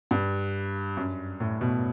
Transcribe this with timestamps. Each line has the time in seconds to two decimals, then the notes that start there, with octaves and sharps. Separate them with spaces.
0.11 G2
0.97 F#2
1.40 A2
1.61 B2